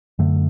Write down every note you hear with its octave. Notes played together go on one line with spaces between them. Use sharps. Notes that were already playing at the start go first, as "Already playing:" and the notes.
F#2 D3 A3